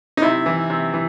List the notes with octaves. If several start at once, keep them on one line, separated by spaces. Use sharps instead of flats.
D#4
C3 E4
E3
C3
E3